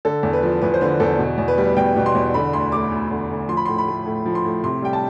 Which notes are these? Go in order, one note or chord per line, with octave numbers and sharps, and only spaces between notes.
D3 A4
E2
B4
F3
E2 B4
C5
D3 B4
E2 A4
B2
E2
B4
G3
E2 G5
B2
C6
E2
D3 B5
D2 C6
A3 D6
D2
D3
D2
F3 C6
B5
A2 C6
B5
A3
A2
F3
C6
A2
C3 C6
G3 G5
A5